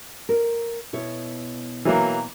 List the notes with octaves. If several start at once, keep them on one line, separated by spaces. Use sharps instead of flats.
A#4
B2 E4 C#5
E3 F#3 A#3